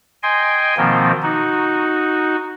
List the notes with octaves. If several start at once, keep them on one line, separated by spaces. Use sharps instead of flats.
D#5 G5 G#5 C6
B2 D#3 F3 A#3 C4
D#4 F#4